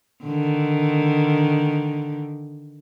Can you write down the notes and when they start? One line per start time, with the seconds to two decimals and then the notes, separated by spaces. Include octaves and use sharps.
0.25 D3 D#3